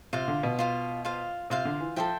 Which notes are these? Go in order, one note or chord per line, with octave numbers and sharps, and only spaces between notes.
C3 F4 C5 F5
D3
B2
F4 C5 F5
F4 C5 F5
C3 F4 C5 F5
D3
E3
F3 A4 C5 E5 G5